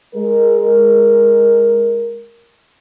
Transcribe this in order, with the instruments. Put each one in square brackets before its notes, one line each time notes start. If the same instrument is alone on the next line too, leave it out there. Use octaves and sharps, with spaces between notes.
[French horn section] G#3 A#4